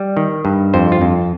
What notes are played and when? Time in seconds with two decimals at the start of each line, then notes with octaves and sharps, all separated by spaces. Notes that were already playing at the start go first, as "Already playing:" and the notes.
Already playing: G3
0.17 D#3
0.45 G2
0.74 F2 C5
0.92 F4
1.02 F2